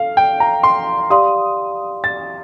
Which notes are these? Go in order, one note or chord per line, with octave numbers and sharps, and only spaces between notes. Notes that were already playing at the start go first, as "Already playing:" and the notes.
Already playing: A4 F5
G5
A#5
C6
G4 D5 F5 C6 D#6
A6